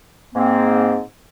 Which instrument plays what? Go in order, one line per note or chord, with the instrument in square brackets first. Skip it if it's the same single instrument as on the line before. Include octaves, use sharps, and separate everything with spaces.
[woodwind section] G#2 A#3 C4